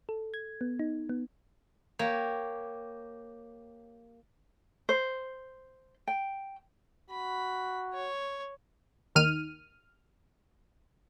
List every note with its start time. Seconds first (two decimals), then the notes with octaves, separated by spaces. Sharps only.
0.09 A4
0.34 G#6
0.61 B3
0.79 D#4
1.09 B3
1.99 A#3 G4 C#5
4.89 C5
6.07 G5
7.10 F#4 B5
7.93 C#5
9.15 D#2 D#3 F6 D#7